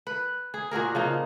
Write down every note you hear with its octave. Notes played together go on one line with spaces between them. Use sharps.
B4
G#4
A#2 F#4 G#4 A#4
C#3 F3 D#4